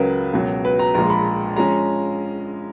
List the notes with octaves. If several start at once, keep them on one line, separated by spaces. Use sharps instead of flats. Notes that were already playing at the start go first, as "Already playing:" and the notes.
Already playing: C#2 C#3 F#3 A#4 B4
C#2 B2 F#3
B4
A#5
A#1 A#2 G#3 A#5
B5
F3 G#3 C#4 A#5